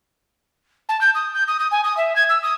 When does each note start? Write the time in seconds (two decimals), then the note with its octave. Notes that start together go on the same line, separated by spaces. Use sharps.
0.89 A5
1.01 G6
1.15 D#6
1.34 G6
1.48 D#6
1.60 D#6
1.71 G#5
1.84 D#6
1.97 E5
2.16 G#6
2.29 E6
2.43 D#6